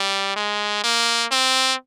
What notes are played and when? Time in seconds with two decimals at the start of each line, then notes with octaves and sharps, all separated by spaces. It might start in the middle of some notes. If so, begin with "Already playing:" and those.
Already playing: G3
0.36 G#3
0.84 A#3
1.31 C4